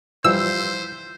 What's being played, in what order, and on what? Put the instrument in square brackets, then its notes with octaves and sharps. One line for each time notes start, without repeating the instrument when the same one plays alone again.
[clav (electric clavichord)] E3 F3 G3 [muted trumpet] C5 [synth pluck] E6